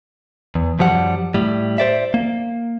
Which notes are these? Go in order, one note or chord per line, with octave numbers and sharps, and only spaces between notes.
E2
F#2 F3 G3 F#5
A2 G3
C5 D5 E5
A#3